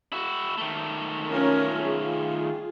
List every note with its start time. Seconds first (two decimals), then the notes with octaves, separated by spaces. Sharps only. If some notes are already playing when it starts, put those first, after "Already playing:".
0.12 E4 F#4
0.58 D#3 A3
1.27 C#4 F4 A#4
1.82 F4 G#4